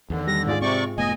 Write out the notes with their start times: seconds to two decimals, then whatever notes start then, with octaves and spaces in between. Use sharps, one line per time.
0.10 E2 D3 D#3
0.27 G3 A#6
0.47 G#2 F4 G#4 D5
0.62 C3 C4 D5 C#6
0.98 F1 A3 B3 D#5 G#5